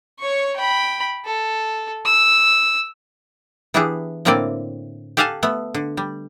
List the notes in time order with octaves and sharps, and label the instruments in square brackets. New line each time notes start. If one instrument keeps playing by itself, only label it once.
[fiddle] C#5 C#6
G5 B5
A4
E6
[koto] E3 B3 D4 E4 G4 G#4
A2 D3 A#3 C4 E4 D5
G4 A4 F5 F#5 G#5 A5
A3 B3
D3
G3